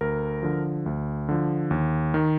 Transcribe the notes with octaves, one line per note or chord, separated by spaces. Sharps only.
D2 A#4
D3 F3
D2
D3 F3
D#2
D#3